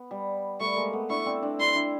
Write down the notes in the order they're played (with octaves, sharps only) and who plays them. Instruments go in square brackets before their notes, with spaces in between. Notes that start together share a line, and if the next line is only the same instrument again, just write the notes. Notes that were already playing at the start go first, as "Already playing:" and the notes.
Already playing: [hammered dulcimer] B3
G3
[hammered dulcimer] G3 A3 [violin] C#6
[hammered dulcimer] G#3 A#3
A3 B3
[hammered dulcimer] D4 E4 [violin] C#6
[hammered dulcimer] C4 D4
C4 D4
[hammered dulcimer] D4 E4 [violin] C6
[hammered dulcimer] D4 E4